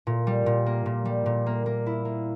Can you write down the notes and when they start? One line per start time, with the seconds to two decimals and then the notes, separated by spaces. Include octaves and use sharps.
0.07 A#2
0.27 G3
0.46 A#2
0.66 A#3
0.86 A#2
1.05 G3
1.26 A#2
1.46 A#3
1.66 A#3
1.86 E4
2.05 A#3